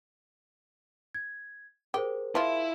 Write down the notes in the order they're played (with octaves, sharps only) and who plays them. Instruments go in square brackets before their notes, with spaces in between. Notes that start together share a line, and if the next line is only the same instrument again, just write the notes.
[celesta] G#6
[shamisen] G4 [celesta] G#4 A#4 C5
[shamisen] F3 F4 [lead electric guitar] E4